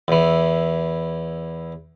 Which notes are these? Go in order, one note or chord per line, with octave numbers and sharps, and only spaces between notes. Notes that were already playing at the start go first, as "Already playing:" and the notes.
E2 E3